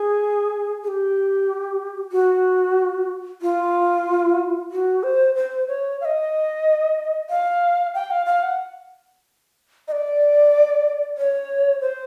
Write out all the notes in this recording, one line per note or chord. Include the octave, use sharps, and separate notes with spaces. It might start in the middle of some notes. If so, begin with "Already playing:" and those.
Already playing: G#4
G#4
G4
F#4
F4
F#4
C5
C5
C#5
F5
D#5
F5
G5
F5
F5
F#5
D#5
D5
C#5
C5